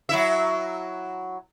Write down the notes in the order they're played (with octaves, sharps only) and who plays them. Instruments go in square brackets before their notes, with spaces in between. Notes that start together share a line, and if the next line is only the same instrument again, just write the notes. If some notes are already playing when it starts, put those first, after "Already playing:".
[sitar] F#3 E4 E5